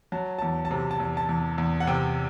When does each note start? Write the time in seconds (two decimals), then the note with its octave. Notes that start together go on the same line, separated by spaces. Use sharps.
0.12 F#3 A5
0.38 E2 A5
0.65 A5
0.71 C3
0.91 A5
1.00 E2
1.17 A5
1.29 E2
1.58 E2
1.80 F#5
1.87 C3 G5